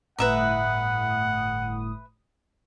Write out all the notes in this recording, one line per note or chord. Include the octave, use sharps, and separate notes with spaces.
G1 A2 B4 E5 F#5 A#5 D#6